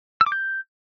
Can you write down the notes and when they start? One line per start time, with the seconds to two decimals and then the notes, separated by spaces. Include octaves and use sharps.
0.21 E6
0.26 D6
0.32 G6